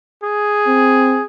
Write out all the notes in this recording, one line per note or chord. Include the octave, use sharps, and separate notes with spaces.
G#4
C4